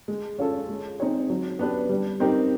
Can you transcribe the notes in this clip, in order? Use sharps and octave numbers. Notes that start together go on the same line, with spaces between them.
G#3
C#4 F4 A4
G#3
C4 D#4 G#4 C#5
F#3
B3 D4 G4 B4
G3
C4 D#4 G4 A#4